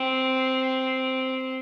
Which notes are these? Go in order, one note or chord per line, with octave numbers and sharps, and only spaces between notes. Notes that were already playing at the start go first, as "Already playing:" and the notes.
Already playing: C4